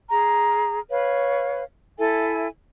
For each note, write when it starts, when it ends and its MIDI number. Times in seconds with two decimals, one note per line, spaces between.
0.10 0.80 68
0.10 0.80 82
0.90 1.64 71
0.90 1.64 73
0.90 1.64 77
1.99 2.49 64
1.99 2.49 69
1.99 2.49 76
1.99 2.49 80